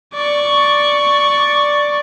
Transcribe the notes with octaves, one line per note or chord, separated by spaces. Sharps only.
D5 C#6